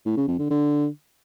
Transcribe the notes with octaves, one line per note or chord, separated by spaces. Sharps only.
A2
C#3
F2
D3
D3